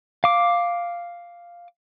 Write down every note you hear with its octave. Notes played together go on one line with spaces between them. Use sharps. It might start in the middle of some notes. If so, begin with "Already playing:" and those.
F5 D6